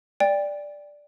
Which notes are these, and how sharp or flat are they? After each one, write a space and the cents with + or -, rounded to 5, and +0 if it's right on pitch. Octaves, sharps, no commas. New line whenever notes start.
D5 +0 G5 +25